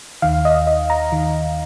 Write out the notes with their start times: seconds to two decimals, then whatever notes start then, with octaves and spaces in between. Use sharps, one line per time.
0.22 D#2 D#3 F5
0.45 D#5
0.67 D#5
0.90 A#5
1.12 D#2 D#3